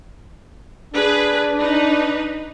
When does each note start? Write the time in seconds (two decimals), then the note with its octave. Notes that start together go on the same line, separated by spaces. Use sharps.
0.94 D4 G#4 B4
1.61 D#4 B4